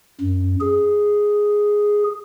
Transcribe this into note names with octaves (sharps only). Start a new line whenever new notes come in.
F#2
G#4